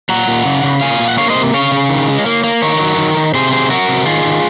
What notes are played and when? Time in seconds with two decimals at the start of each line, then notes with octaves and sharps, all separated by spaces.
0.09 A#2 F#5 A#5
0.27 A#2
0.45 C#3
0.64 C#3
0.81 A#2 F5 G#5
0.99 A#2
1.08 F#5
1.18 A#3 C#5 F5
1.30 C5 D#5
1.35 C3
1.53 C#3 C#5 F5
1.72 C#3
1.89 D#3
2.08 G#3
2.26 A#3
2.44 A#3
2.62 D#3 A#4 C#5
2.80 F#3
2.98 D#3
3.17 D#3
3.34 C3 G#4 C5
3.52 F#3 G#4 C5
3.70 F#3 F#4 A#4
3.88 C3
4.06 D#3 F4 G#4
4.25 D#3